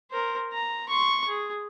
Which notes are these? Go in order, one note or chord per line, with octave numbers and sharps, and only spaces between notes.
A#4 C5
A#5
C6 C#6
G#4